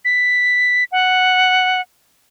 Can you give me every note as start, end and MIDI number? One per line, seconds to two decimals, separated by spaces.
0.05 0.84 95
0.92 1.81 78